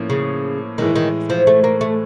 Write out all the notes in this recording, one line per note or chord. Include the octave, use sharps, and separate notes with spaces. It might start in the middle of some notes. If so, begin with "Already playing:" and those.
Already playing: A2 F3 A#3 C#4
C#3
A2 D#3 E3 G#3
D#3
F3
A3
A#3
A3